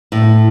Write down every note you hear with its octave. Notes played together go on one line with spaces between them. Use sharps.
A2